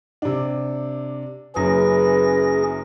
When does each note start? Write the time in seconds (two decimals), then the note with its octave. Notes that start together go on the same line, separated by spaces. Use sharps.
0.22 C3 D4
1.56 F#1 F#2 C#4 G#4 B4 A#6